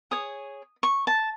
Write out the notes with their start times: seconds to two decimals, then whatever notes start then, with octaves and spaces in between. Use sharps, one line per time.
0.11 G#4 C#5 D#6
0.83 C#6
1.07 A5